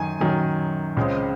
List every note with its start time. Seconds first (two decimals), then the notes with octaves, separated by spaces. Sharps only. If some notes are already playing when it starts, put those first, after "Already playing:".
Already playing: F#2 D#3 G#5
0.20 F#2 D#3 F#3 C#4
0.97 C#2 C#3 G#3 C4